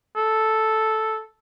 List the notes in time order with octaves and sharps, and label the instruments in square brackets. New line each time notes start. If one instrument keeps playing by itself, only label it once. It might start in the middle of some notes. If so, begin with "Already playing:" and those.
[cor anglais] A4